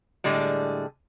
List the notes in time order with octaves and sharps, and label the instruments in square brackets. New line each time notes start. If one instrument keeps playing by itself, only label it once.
[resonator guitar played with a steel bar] A2 D3 G3 G#3